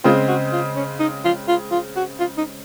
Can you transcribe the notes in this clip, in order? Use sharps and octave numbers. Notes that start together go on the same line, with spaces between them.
C#3 G#3 C4 F4
F#4
F4
C#4
D#4
F4
F4
F4
F#4
F4
D#4